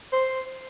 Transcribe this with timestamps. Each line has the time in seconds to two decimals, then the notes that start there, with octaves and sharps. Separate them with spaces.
0.13 C5